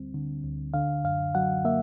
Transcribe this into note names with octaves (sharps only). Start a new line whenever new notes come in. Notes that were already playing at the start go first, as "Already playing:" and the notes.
Already playing: D2 D3 G3 C4
D3
D2
D3 F5
F#2 F5
F#3 F#5
A#3 E5